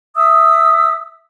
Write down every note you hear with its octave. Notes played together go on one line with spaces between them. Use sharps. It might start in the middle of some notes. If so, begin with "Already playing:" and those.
E5 D#6 E6